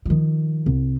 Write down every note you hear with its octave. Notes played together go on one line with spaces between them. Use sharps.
D#3 F3
C2